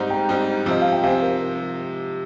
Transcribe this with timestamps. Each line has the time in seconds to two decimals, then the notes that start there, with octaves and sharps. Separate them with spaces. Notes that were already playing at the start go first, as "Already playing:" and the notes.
Already playing: G#2 G3 C4 D#4
0.10 G5 A#5
0.29 G#2 G3 C4 D#4
0.66 C3 F3 C4 D#5
0.82 F5
0.92 G5
1.03 C3 F3 C4 F5 G#5
1.22 A#4